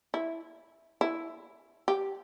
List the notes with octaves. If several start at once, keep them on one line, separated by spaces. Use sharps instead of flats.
E4
E4
G4